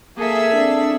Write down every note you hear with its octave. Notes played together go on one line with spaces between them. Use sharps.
A#3 G#4 A4 E5
C4 D4